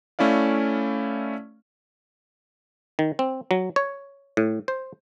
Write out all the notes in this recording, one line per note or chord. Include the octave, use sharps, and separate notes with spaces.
A3 C#4 E4 D5 F5
D#3
C4
F#3
C#5
A2
C5